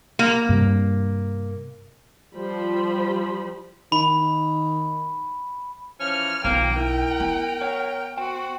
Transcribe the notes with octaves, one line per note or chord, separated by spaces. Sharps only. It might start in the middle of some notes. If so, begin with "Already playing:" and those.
A#3
G2 C3
F3 G3 C5 B5
D#3 B5
E3 F3 C#4 F6
B1 D#3 F3 A#3 B3 G5
E4 A#4
B3
C#5 F#5
F#4 C5 G5